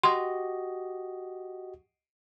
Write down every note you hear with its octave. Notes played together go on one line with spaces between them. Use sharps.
F#4 G4 D#5 C6